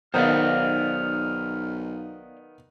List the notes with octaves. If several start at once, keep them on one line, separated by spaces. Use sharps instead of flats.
B1 D#3 B3 C5 D5 F5 F6